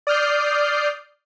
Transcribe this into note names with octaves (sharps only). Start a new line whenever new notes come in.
D5 D#6 F6 G6 C7